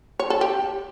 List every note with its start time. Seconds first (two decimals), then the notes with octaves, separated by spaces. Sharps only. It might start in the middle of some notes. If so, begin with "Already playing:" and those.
0.19 C#5
0.30 A4
0.41 G4